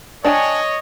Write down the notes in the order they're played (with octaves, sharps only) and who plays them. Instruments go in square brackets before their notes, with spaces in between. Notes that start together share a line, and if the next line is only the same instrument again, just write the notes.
[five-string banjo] D4 G5 G#5 [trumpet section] C#5 D#5